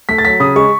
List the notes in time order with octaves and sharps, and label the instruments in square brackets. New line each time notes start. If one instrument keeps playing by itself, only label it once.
[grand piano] A3 B6
A6
F#3 B6
C#3 D#6
G#3 C#6